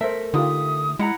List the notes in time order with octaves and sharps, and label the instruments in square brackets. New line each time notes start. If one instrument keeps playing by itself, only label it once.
[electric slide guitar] A3 A#4 E5 [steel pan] C5 A5
[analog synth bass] D3 [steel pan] D#4 F4 G4 [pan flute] D#6
[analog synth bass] G#3 [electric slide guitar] E4 F#5 A#5